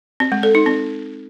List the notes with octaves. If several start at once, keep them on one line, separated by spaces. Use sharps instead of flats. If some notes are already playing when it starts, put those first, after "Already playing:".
C4
G#3
A4
D#4
C4